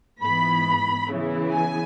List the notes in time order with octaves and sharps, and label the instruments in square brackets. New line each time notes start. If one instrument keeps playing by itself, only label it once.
[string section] G#2 E3 B3 B5
C#3 E3 B3 E4
G#5